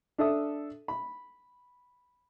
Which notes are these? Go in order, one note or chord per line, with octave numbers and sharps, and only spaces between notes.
D4 A4 E5 D#6
B5